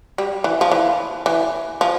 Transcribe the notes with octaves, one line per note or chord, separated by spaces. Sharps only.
G3
E3
F3
E3
E3
F3